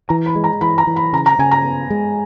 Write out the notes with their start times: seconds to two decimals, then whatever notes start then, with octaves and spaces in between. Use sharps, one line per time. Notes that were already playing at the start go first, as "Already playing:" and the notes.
0.09 E3 A#5
0.26 B5
0.35 G#3
0.44 A#5
0.61 E3 B5
0.78 A#5
0.87 E3
0.96 B5
1.13 C#3 A#5
1.26 A#5
1.39 C#3 G#5
1.51 A#5
1.65 B3
1.90 G#3